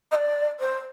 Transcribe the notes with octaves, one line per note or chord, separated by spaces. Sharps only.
D#5
D5
C5